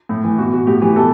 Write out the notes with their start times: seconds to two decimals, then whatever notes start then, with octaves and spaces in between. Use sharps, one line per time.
0.09 A2
0.24 E3
0.38 B2 F#4
0.53 F#4
0.67 A2 G4
0.82 E3 G4
0.96 B2 A4